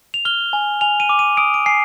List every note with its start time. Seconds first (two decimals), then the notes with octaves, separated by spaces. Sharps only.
0.14 F7
0.25 F6 G7
0.53 G#5
0.81 G#5 F7
1.00 D#7
1.09 D6
1.19 D#7
1.37 D#6 D7
1.54 D7
1.66 G#5 C7